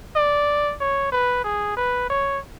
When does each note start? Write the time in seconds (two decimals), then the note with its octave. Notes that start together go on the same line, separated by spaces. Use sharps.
0.16 D5
0.80 C#5
1.12 B4
1.44 G#4
1.77 B4
2.10 C#5